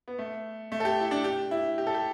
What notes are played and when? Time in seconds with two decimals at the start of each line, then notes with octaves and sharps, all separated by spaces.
0.08 B3
0.19 A3
0.72 A3
0.80 A4
0.85 G4
1.00 E4
1.11 D4
1.24 G4
1.51 E4
1.78 G4
1.87 A4
1.94 G4